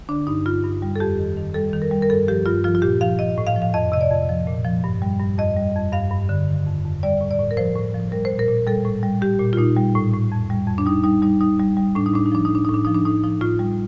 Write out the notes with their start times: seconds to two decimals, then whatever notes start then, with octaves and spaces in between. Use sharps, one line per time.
0.09 D3 D4
0.27 G2 D#4
0.46 G2 F4
0.64 G2
0.82 G3
0.96 A4
1.00 F2 G4
1.19 D#3
1.37 D#3
1.54 G3 A4
1.73 D#3
1.82 A#4
1.91 G3
2.02 A#4
2.10 G2 A4
2.28 F3 G4
2.46 G2 F4
2.64 F3 F4
2.75 F4
2.82 A#2 G4
3.01 F3 F5
3.19 F3 D#5
3.38 A2
3.47 F5
3.56 F3
3.62 F5
3.74 F2 D#5
3.92 C3 D#5
4.01 D5
4.11 F2
4.29 F3
4.47 A#2
4.65 F3
4.84 G2
5.02 G3
5.19 G2
5.39 F2 D#5
5.57 G3
5.75 F2
5.92 G2 F5
6.11 G2
6.29 D3
6.48 D#3
6.67 F2
6.85 F2
7.03 G3 D5
7.21 A2
7.31 D5
7.39 A2
7.51 A#4
7.57 F3 C5
7.76 A2
7.94 F3
8.12 G3 A#4
8.25 C5
8.31 A#2
8.39 A#4
8.48 A#2
8.67 G3 A4
8.85 A2
9.03 G3
9.21 G3 G4
9.39 A#2
9.53 F4
9.58 A#2 D#4
9.76 G3
9.95 A2
10.14 A2
10.32 F2
10.50 G3
10.68 F2
10.78 D4
10.86 G3 D#4
11.04 G3 D#4
11.22 G3 D#4
11.41 G3 D#4
11.60 G3
11.77 G3
11.95 A2 D4
12.06 D#4
12.14 A2 D4
12.26 D#4
12.32 F3 D4
12.45 D#4
12.50 A2 D4
12.65 A2 D#4
12.74 D4
12.85 F3 D#4
12.94 D4
13.05 A2 D#4
13.24 F3 D#4
13.41 A2 F4
13.59 G3